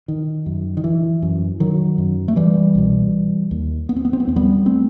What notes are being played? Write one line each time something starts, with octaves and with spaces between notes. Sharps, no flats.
D#3
F#2
D#3
E3
F#2
D#3 F#3
F#2
A3
E3 G3
C2 B2
D#2
B3
C4
B3
C4
B3
D#2 C4
G3 B3
A3 C4